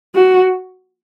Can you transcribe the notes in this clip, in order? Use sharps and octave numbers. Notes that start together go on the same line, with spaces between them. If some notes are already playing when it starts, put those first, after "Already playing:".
F#4